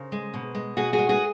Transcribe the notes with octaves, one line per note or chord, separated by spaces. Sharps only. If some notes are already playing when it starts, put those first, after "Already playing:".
Already playing: C#3 A#4 C5
G#3
B2
G#3
B2 F#4 G#4
F#4 G#4
G#3
F#4 G#4